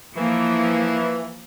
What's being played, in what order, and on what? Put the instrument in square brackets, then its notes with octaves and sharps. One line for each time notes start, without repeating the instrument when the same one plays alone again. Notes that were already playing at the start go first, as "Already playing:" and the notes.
[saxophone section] E3 [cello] F3 A#3